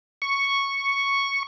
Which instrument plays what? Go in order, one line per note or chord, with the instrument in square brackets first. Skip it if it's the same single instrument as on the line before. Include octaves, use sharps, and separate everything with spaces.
[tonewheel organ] C#6